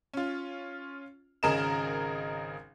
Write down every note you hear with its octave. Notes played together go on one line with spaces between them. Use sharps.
C#4 F4
G#1 C#3 G#4 A#4 D#5 E7